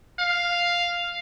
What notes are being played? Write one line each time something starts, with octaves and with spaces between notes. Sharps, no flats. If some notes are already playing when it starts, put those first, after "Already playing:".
F5